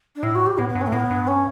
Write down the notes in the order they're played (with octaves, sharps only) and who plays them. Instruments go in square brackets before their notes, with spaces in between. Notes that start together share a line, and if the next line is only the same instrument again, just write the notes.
[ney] D4
[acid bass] A2 [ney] E4
[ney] F#4
G4
[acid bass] A2 [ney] B3
[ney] B3
[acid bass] G2
[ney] C#4
A3
[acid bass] A2 [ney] B3
[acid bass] G2
[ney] C#4